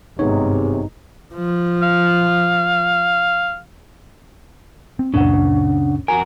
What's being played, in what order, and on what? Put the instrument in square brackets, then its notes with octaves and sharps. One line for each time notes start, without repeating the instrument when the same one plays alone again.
[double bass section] G#1 G2 [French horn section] C3 G#4 [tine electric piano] B3 C#5 [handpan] D#4
[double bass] F3
[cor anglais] F5
[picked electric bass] C4
[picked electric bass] C#2 F#2 A#2 [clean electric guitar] C#3 [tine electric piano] D4 F#5
[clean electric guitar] F2 F#4 A#4 [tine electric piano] G#5